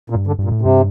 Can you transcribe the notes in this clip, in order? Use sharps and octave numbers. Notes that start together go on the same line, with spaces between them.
A#2
G2
D3
G2
A#2
A2
G2 C3